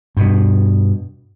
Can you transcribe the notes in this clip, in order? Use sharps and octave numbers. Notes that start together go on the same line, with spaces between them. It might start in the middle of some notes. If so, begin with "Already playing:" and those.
G2 B2